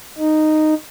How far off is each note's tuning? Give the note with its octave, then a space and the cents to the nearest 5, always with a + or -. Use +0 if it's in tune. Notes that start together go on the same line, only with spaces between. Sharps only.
D#4 -10